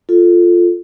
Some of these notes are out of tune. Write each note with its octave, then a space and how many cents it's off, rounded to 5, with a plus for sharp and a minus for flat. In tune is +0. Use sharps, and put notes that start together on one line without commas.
F4 +0 A4 +0